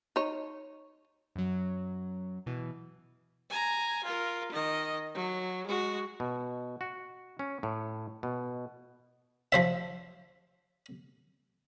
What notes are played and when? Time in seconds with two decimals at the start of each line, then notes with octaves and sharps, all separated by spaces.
0.16 D#4 C#5
1.36 F#2 F#3
2.46 B2 E3
3.50 G#5 A#5
4.04 F4 A#4
4.52 D#3 D#5
5.14 F#3
5.66 G#3 F#4
6.20 B2
6.81 F#4
7.39 C#4
7.63 A2
8.23 B2
9.52 F3 C5 E5